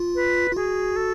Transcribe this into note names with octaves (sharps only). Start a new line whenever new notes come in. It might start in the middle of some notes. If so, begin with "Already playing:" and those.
Already playing: F4
B4
F4
F#4 G#4
A4